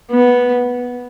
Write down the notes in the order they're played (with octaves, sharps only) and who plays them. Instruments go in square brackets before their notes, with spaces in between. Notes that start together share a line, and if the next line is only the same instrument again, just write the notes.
[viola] B3